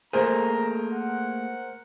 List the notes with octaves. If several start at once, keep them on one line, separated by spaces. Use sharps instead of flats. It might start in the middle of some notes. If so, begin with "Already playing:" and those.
A3 A#3 G#4 A#4 C5 A#5
F#5